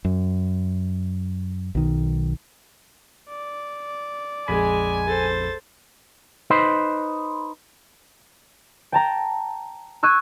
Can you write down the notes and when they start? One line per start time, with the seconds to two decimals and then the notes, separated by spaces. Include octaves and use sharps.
0.05 F#2
1.75 B1 D#3
3.30 D5
4.48 A#1 F2 G#3 G#5 B5
5.08 A4 C5 A6
6.50 D#4 B4 C5
8.92 G5 A5 A#5
10.03 C#6 E6 F#6 G#6 D#7